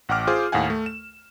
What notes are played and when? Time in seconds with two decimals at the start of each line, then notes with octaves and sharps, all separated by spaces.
0.09 A1 F#5 G5 D6 F6
0.27 F4 G#4 C5 D6
0.52 D#2 A2 F5 F#5 G#5
0.70 A3
0.86 E7